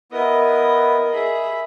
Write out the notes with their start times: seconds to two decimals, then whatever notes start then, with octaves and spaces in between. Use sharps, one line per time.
0.12 B3 E4 A#4 B4 D#5
1.14 G#4 E5 B5